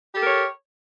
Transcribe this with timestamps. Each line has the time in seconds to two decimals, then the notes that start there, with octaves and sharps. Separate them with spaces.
0.12 G4
0.17 A4
0.22 A#4
0.26 C#5